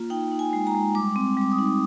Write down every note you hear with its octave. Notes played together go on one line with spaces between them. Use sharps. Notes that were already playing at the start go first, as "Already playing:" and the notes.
Already playing: A#3 F4
D#4 G5
D#4
G#5
G#3 G#5
A#5
G#3
G3 D6
C4
G3 D6
D#6
D#4